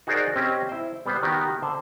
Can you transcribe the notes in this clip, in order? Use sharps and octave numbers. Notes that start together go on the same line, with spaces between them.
D#4 F#4 G#4 A#4 C5 D5
C4 C#4 G4 C5 D#5
E4 C5
G3 B3 B4 C5 F#5
D#3 B3 F#4 G4
D3 C5